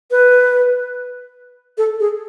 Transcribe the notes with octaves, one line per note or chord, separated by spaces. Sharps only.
B4
A4
G#4